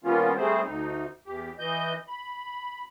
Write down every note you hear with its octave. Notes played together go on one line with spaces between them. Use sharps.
D#3 G3 A#3 B3 C#4 F4
G3 A3 C4 G#4 C5
D2 D#4
E2 G4
E3 D#5 G6
B5